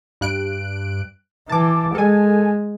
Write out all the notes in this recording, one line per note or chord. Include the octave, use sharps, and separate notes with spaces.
G2 F#6 D7
E3 A5 D6
G#3 A4 G#5